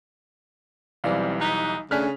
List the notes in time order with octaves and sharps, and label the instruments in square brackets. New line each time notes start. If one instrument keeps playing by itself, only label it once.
[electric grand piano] B1 E3 G3 [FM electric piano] C4 D5 F5
[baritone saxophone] D#4 [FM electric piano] F#6 B6
[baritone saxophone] C#3 [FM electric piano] A3 D4 G#5 [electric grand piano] F6 F#6 B6